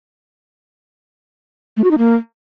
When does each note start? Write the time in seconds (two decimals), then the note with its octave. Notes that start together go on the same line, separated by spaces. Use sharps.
1.77 A3
1.84 F#4
1.91 D#4
1.98 A#3